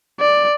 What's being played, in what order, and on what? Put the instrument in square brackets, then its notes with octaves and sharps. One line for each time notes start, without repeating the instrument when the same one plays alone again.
[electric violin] D5